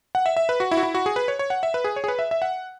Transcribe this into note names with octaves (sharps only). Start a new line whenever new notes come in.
F#5
E5
E5
B4
F#4
E4
F#4
E4
F#4
G#4
B4
C#5
C#5
F#5
E5
B4
G#4
C#5
G#4
B4
E5
E5
F#5